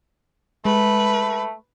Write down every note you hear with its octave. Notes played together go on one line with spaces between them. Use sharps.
G#3 A3 B4